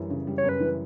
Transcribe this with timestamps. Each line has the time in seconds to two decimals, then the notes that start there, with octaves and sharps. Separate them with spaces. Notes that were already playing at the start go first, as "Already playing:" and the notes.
Already playing: F#2 E3 G3
0.10 C#3
0.27 G3
0.38 C#5
0.44 F#2 B4
0.60 E3